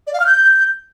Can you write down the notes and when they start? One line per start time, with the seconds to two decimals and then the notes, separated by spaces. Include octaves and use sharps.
0.07 D5
0.13 F5
0.20 F6
0.26 G6